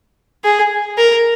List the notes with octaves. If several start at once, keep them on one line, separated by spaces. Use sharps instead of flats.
G#4
A#4